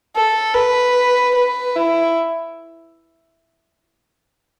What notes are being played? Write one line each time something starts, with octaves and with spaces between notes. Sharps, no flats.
A4
B4
B4
E4